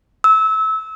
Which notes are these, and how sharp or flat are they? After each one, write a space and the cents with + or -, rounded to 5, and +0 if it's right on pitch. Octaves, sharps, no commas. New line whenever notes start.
E6 -25